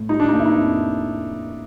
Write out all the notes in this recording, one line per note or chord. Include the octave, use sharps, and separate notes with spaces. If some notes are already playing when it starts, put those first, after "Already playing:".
Already playing: A2
G3 D#4
D4
D#4
A#3
E4
D#4
F2